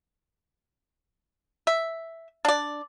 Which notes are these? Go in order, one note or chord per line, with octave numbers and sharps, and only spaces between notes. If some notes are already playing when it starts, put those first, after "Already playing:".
E5
D4 D5